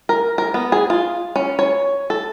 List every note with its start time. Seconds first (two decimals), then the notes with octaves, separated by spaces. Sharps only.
0.09 A#4
0.38 A#4
0.54 B3
0.72 G#4
0.90 F4
1.36 C#4
1.59 C#5
2.10 A4